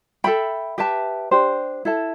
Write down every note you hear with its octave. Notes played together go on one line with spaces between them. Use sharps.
A4 E5 G5 B5
G4 B4 E5 A5
D4 G4 C5
E4 A4 E5 A5